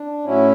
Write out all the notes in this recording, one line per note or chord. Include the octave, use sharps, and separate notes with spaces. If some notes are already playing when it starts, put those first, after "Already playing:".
Already playing: D4
A2 F#3 C#4 E4